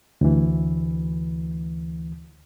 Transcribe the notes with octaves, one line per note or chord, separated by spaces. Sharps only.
D2 E3